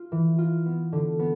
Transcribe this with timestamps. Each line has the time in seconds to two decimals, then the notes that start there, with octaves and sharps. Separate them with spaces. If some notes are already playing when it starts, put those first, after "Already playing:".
Already playing: F4
0.12 E3
0.38 F4
0.66 B3
0.92 D3
1.19 B3